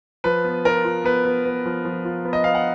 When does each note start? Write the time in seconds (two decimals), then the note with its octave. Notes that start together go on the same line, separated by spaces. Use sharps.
0.24 F3 B4
0.45 B3
0.65 F4 A#4
0.84 F4
1.04 B3 B4
1.25 B3
1.46 B3
1.65 F3
1.85 F3
2.05 F4
2.25 B3
2.33 D#5
2.44 B3 F5
2.55 F#5